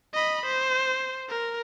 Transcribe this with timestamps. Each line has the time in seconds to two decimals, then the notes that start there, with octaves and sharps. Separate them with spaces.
0.14 D#5 B5
0.46 C5
1.29 A#4